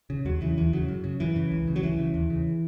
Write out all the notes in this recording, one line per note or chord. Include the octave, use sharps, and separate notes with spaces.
C#3
D#2 F#3
C#3 E3
D#2 E3
C#3 F#3
F#2
C#3
F#2 E3
C#3
C#2
C#3
F#3
C#2 E3
C#3
D#2
C#3